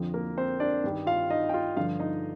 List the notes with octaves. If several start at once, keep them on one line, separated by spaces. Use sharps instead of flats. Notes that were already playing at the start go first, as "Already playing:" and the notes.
Already playing: F2 D3 F3
A#3 A#4
C4 C5
D4 D5
G2 D#3 G3
F4 F5
D#4 D#5
G5
F4 F5
G2 D3 F3 F4 F5
D#4 D#5